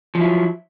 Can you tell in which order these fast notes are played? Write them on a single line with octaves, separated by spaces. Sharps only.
F3 F#3 E4